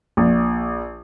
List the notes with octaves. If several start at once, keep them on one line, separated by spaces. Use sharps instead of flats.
A#1